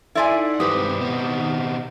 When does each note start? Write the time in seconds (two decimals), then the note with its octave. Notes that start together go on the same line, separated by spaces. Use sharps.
0.15 D#4 E4 A4 D5 E5 F#5 G#5 C6
0.60 G2 C3 D#3 G#3 G4 B4 C5 D#6
1.00 B2 D#3 C4